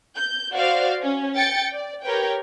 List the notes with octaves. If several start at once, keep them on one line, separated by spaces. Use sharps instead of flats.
G6
F#4 C5 D5 F5
C#4
G5 A6 C#7
D5
G4 A#4 B4 C#5 G5